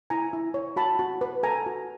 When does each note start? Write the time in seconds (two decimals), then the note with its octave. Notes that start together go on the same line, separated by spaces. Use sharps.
0.10 E4 G#5 A#5
0.33 E4
0.54 C#5
0.76 F#4 A5 B5
0.99 F#4
1.21 B4
1.43 A4 G#5 A#5
1.66 F#4